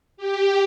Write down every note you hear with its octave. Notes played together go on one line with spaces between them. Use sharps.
G4